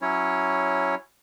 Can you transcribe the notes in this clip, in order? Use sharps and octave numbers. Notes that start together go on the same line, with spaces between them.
F#3 C#4 E4 C#5